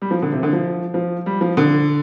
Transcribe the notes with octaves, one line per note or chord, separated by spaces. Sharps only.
G3
F3
D3
C3
D3
F3
F3
G3
F3
D3